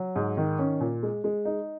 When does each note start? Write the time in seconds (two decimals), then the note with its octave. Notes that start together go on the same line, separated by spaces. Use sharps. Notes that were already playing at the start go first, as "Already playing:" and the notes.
Already playing: F#3
0.16 G#2
0.37 D#3
0.59 C#4
0.81 A#2
1.03 G#3
1.24 G#3
1.45 D#4